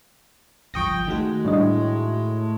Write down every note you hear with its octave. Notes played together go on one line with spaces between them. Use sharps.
G1 C#2 F3 G5 C#6 D#6 A#6
D#3 G#3 A3 F#4
A2 G3 D4 D#5